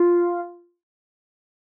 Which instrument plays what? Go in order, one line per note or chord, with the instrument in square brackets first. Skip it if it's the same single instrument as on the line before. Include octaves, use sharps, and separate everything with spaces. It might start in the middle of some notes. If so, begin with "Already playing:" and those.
Already playing: [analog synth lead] F4